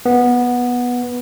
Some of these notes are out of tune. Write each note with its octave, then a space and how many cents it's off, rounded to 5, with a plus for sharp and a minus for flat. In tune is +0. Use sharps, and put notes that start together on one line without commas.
B3 -10